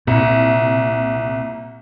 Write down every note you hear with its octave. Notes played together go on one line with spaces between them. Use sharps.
C2 A#2